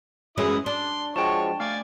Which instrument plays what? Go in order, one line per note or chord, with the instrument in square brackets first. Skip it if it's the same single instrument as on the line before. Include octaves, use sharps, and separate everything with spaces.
[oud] F#2 E3 G#3 [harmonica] E4 D#6
[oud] D4 [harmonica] C6
[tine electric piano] F3 G#3 F#4 [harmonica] C#5 [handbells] G5 A5
[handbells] A3 [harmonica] D5 G#5 [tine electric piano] F5